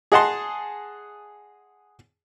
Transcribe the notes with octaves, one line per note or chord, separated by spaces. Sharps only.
G#4 D#5 F#5 A5 C6